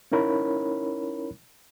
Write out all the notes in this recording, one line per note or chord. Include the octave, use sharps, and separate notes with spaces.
C#4 D#4 E4 A#4 C#5 B5